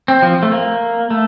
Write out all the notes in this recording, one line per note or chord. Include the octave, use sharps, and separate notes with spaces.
C4
F3
A3
A#3
A3